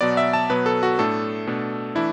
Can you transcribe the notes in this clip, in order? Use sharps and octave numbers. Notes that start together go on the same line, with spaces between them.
B2 F#3 B3 D5
E5
A5
B2 F#3 B3 B4
A4
F#4
A2 A3 D4 A4
B2 A3 D4
E3 A3 D4 E4